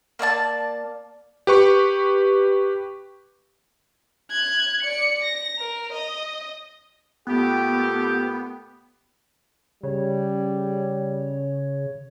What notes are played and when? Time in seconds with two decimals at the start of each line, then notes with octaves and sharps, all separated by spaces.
0.19 A#3 D5 F5 A5
1.47 G4 B4 C#6
4.30 F#6 G#6
4.83 D5 C#7
5.23 A#6
5.59 A#4
5.92 D#5
7.27 A#2 A3 B3 G4
9.83 C#3 G3 C#5